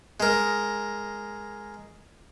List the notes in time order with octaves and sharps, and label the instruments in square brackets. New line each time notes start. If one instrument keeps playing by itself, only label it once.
[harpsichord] G#3 A#4